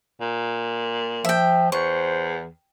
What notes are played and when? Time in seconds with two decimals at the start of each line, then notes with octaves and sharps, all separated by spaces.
0.21 A#2
1.25 F3 E5 G5
1.72 E2 C5 C#6